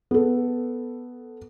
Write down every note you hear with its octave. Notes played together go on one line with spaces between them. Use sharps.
B3 A4